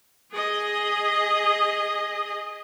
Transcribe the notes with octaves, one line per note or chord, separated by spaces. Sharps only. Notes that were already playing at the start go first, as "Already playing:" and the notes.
G#4 D#5